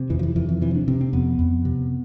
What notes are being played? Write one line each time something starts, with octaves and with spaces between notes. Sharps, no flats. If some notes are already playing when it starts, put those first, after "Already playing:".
Already playing: C3
F2 E3
F3
E3
F2 E3
E3
C3 E3
D4
C3 C4
C4
F2 B3
F2
C3